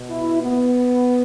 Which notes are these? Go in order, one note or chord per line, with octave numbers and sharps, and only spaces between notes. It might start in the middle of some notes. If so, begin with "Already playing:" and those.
Already playing: B2
E4
B3